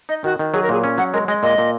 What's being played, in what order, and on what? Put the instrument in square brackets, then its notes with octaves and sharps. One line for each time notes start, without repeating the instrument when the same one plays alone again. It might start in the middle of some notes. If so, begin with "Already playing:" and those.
[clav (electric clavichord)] D#4 [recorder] D#5
[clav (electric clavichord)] D#3 [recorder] F#4
[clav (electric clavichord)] D#3
[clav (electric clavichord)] F#3 [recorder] G#4
[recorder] A#4
[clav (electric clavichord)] A#2 [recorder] G#4
[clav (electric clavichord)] C#4
[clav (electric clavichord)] F#3 [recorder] F#5
[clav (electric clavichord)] G#3 [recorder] A#4
[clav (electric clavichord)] G#3 [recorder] D#5
[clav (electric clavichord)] A#2 [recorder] D#5
[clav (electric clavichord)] A#2